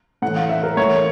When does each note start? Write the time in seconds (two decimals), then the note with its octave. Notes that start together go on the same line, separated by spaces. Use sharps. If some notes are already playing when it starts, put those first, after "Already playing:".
0.22 A2 E3 F#5
0.36 F5
0.49 E5
0.63 A#4
0.77 A2 E3 C#5